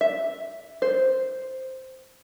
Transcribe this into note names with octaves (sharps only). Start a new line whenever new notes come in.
E5
C5